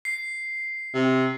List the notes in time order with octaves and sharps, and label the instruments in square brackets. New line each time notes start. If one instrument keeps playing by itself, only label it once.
[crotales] C7
[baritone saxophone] C3